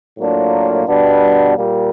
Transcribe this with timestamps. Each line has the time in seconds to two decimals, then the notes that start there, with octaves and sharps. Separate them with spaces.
0.18 A2 F#3 A#3 D4 F4
0.88 B2 G3 B3 D4
1.58 A#2 G3 A#3